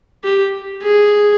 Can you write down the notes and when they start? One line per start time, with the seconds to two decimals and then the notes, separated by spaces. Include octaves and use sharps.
0.24 G4
0.82 G#4